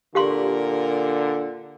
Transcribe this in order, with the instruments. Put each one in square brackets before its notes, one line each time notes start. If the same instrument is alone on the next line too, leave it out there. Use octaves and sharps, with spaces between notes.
[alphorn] A#2 [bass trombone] D3 [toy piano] G4 F5 C6 [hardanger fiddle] A#4